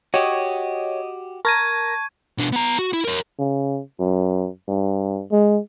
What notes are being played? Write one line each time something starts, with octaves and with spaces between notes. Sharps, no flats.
F#4 G4 C#5 D#5
A#4 A5 C#6 G#6 A#6 D#7
B2 D4
B3 A#5
F#4
E4
A#4 C#5
C#3
F#2
G2
G#3